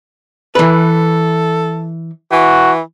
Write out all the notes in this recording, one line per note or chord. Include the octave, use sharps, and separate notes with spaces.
E3 A4 B4
E3 F#4